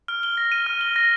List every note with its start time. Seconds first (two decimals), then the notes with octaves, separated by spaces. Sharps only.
0.08 F6
0.23 G7
0.37 A#6
0.52 D#7
0.67 F6
0.81 G7
0.96 A#6